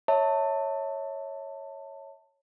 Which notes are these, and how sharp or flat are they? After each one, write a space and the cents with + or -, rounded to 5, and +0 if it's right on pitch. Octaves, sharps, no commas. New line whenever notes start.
C#5 +0 E5 -30 A5 +20